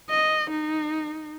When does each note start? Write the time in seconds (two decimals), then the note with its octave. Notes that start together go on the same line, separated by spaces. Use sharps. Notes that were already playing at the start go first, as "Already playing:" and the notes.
0.10 D#5
0.51 D#4